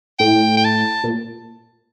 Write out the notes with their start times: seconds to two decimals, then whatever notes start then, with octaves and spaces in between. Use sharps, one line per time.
0.19 A2 G5
0.57 G5
0.65 A5
1.03 A#2